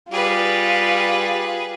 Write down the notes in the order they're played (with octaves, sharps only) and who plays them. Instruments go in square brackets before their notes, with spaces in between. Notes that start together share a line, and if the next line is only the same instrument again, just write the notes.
[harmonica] G3 [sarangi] F4 [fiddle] G#4 B4